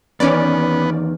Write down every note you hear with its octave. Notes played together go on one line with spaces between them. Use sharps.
E2 D#3 B3 C#4 D5